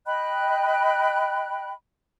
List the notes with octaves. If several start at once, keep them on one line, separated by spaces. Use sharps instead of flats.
D#5 G5 B5 F#6